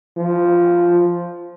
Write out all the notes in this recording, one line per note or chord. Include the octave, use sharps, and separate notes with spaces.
F3